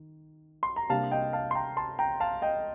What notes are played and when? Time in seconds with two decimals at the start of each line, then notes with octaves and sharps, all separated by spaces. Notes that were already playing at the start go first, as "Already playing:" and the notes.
Already playing: D#3
0.63 C6
0.76 A#5
0.90 C3 G3 A#3 D4 F5 A5
1.11 D#5 G5
1.33 F5 A5
1.51 C6
1.55 G5 A#5
1.77 A5 C6
1.99 G5 A#5
2.20 F5 A5
2.42 D#5 G5